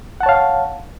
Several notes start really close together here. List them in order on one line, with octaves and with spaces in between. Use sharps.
F#5 A5 C#5 F5